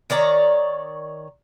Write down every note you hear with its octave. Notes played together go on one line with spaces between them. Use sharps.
D#3 C#5 D5 A#5